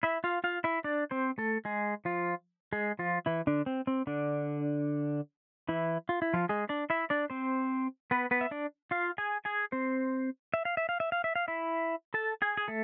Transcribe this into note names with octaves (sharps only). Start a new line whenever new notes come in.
E4 E5
F4 F5
F4 F5
E4 E5
D4 D5
C4 C5
A3 A4
G#3 G#4
F3 F4
G#3 G#4
F3 F4
E3 E4
D3 D4
C4
C4
D3 D4
E3 E4
F4
E4
F3 F4
G#3 G#4
D4 D5
E4 E5
D4 D5
C4 C5
B3 B4
B3 B4
E5
D4 D5
F4 F5
G#4 G#5
G#4 G#5
C4 C5
E5
F5
E5
F5
E5
F5
E5
F5
E4 E5
A4 A5
G#4 G#5
G#4
A3 A4